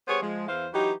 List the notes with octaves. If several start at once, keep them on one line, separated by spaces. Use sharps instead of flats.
G3 B3 G#4 C5 C#5
F3 G#3
E2 E3 C5 F5
E3 F#3 D#4 G4